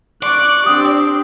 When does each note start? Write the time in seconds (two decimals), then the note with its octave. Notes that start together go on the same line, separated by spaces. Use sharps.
0.23 D5 C#6 D6 F#6
0.66 C4 D4 G4 D#6